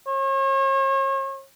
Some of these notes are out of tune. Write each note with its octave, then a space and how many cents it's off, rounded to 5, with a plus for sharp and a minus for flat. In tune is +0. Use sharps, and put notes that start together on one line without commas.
C#5 -40